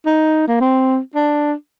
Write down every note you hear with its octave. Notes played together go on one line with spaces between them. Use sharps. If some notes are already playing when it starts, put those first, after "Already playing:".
D#4
A#3
C4
D4